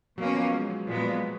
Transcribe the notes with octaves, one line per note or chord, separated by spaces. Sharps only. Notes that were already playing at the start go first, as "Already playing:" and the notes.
B2 F#3 A#3 C#4
F3
G#3
F#3
A#2 F3 G#3 B3
F#3
F3